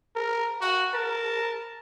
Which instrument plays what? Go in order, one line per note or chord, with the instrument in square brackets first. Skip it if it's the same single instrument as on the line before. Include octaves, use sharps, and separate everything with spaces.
[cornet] A#4
[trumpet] F#4 [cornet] F#5
[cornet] A#4 [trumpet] A5